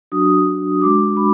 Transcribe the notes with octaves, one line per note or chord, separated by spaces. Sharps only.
F#3 D4 F#4 D#6
G#3 D4 F#4 D6
B5